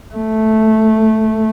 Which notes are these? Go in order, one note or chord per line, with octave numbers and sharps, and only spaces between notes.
A3